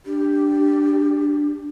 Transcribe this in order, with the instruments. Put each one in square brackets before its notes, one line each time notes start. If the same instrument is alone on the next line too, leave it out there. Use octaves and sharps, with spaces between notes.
[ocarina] D4 [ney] G4